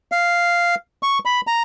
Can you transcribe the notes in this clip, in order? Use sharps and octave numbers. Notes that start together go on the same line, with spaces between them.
F5
C#6
B5
A#5